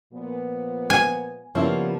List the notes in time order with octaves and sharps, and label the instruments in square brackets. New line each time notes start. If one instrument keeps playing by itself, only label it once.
[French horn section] A#2 F3 B3
[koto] G#5
[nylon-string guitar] C#3 F3 A#3 [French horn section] G3 B3 [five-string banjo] C#4 E4